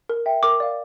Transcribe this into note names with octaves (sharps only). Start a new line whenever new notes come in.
A#4
E5 G5
A#4 D6
D5 F5